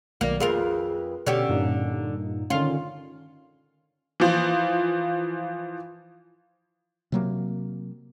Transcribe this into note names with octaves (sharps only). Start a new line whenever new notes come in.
B1 D#3 A#3 D5
F2 F4 G#4 A#4 B4
B2 D3 C#4 G4
G2 A#2 D#4
D3 D#3 C#4 F4
E3 F3
C3 F#3 A#3